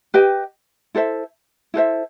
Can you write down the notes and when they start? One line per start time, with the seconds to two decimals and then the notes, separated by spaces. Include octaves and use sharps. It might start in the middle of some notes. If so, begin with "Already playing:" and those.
0.14 G4 B4 D#5 G5
0.95 E4 A4 C5 E5
1.74 E4 A4 C5 E5